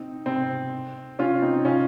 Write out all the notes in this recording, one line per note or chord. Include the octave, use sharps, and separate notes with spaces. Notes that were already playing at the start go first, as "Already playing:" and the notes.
Already playing: C4 D#4
C4
C#4 F4
C4 D#4
C#4 F4